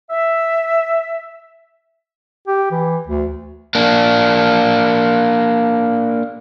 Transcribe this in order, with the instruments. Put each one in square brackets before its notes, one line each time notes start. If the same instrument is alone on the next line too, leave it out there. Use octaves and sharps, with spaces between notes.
[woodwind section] E5
[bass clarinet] G4
E3
D2
[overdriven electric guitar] A#3 D4